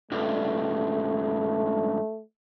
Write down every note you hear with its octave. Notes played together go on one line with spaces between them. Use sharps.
C#2 G2 A3